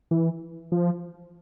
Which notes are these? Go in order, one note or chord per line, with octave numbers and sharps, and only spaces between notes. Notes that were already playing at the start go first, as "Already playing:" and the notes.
E3
F3